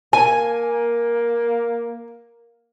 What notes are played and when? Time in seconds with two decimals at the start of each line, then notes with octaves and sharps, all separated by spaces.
0.13 A#3 G#5